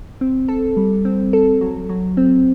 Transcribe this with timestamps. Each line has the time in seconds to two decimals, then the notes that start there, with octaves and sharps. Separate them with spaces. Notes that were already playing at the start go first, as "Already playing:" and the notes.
0.21 C4
0.48 A4
0.77 G3
1.05 C4
1.33 A4
1.61 F#3
1.89 F#3
2.17 C4